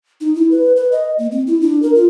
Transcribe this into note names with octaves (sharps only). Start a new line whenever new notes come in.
D#4
E4
B4
B4
D#5
A#3
C4
E4
D4
A#4
F4